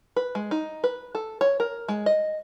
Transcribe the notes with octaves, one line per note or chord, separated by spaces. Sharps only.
B4
G#3
D#4
B4
A4
C#5
A#4
G#3
D#5